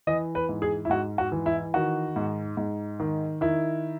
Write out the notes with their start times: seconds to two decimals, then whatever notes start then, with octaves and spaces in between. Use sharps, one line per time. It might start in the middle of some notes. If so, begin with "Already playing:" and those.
0.07 E3 D#5
0.35 B4
0.49 G#2
0.62 G#4
0.85 E4
0.90 G#2 F#4
1.18 F#4
1.32 E3
1.46 E4
1.74 D#3 F#4
2.16 G#2
2.57 G#2
3.00 D#3
3.41 D#3 E4